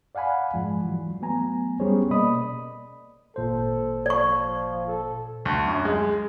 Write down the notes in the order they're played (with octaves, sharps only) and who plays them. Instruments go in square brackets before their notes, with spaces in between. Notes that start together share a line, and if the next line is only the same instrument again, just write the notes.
[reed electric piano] D5 F5 F#5 G#5 B5
G#2 F3 G#3
E3 F#3
F#3 A3 B3 G#5 A#5
G3 B3 C#4 G#4 C5 C#5
B2 A#3 D5 D#5 B5 D#6
[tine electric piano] G#1 A#2 C5 [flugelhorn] A4
[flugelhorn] F3 [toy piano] D5 C#6
[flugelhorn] A4
[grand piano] D2
F#2
G#3